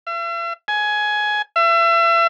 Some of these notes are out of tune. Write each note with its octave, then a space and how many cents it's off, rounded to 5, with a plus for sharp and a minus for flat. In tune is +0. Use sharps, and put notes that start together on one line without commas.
E5 +45
G#5 +15
E5 +35